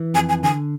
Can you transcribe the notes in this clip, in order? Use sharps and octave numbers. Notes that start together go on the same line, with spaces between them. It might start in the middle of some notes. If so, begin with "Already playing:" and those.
Already playing: E3
F2 G#5
G#5
D3 G#5